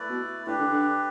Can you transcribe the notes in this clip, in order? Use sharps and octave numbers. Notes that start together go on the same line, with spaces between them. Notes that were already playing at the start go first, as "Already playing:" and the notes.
Already playing: A3 E4 B4 D5
B2
A2 D4 G4 B4
D3
D3